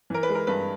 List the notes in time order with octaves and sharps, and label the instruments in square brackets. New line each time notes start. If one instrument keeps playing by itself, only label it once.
[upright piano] E3 A#4
B4
G#3
A#4
G2 B4